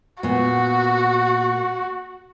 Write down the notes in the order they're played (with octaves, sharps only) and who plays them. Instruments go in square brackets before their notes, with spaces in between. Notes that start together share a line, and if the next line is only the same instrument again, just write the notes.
[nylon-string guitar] A#2 B3 [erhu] F#4